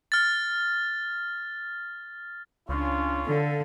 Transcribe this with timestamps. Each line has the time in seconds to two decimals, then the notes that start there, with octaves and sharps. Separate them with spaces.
0.12 F6 A6
2.69 C#2 C#3 C#4 D4 F4
3.27 D3 A4 F5